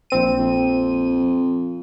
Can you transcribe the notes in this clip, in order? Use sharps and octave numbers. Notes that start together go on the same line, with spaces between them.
A#1 C4 D#7
F2